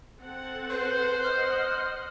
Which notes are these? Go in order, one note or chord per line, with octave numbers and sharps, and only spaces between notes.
C4 A4 F#5
B4 C5
D#5 F#5 F6